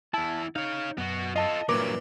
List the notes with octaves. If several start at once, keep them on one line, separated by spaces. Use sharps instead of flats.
E2 E4 A5
D#4 C#5 F5
F#2 B3 F#4
F4 A4 D#5 A5
G2 A#2 E3 F#3 A#4 B4 D6